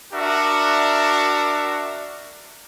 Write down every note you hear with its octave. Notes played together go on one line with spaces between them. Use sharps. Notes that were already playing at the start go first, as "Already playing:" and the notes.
D4 F#4 A#4 E5